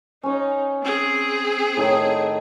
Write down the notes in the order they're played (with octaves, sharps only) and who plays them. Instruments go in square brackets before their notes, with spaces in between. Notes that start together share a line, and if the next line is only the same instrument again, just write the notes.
[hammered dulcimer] C#4 C#5 [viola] D#4
[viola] C4 G#4
[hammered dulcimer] A2 D#3